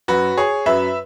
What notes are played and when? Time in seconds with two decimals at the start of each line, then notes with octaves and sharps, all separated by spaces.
0.08 F#2 F#3 F#4 B4
0.38 G#4 C#5
0.66 F#2 F#3 B4 E5